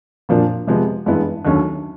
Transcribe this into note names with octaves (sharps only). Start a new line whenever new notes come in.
A#2 F3 A#3 D4
C3 F3 G#3 B3
G2 E3 G#3 B3 E4
D#2 D3 F#3 A3 C#4